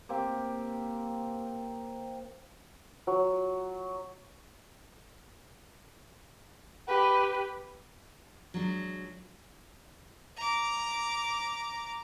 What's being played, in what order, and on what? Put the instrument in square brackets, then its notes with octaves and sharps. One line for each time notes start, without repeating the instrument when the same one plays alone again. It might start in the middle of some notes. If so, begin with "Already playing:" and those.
[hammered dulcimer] A#3 C4 G4
[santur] F#3
[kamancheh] G4 B4
[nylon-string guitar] F#3 G#3 D4
[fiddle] A#5 D6